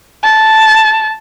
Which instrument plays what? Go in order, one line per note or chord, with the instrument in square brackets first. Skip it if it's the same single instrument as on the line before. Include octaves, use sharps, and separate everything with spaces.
[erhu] A5